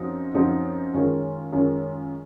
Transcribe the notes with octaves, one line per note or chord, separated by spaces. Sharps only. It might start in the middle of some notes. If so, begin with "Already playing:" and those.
Already playing: F#2 F3 C4 D#4 F#4
F#2 F3 C4 D#4 F#4
F#2 D#3 G#3 C#4 F4
F#2 D#3 G#3 C#4 F4